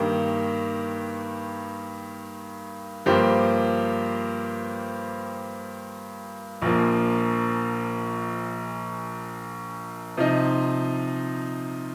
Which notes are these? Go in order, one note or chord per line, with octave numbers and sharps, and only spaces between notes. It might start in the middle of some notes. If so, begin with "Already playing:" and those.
Already playing: G2 D#3 A#3 G4
G2 F3 A#3 G4 C5
A#1 A#2 F3 A#3
C3 F3 D#4